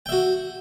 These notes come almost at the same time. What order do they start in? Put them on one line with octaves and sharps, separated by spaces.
G5 E5 F#4